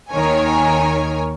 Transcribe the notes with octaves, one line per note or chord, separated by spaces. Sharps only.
D#2 D#3 A#4 C#5 G#5